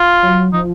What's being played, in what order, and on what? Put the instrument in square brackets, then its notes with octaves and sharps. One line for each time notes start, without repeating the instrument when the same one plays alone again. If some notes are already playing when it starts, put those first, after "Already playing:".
Already playing: [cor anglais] F4
[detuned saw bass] F#3
[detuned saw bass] F3 [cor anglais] D#4